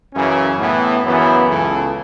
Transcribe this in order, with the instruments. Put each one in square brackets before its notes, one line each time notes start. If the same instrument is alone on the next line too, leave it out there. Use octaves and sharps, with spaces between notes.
[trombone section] F#2 C#3 E3 C#4
A2 E3 B3
F#2 C#3 E3 B3
C#2 C#3 E3 A4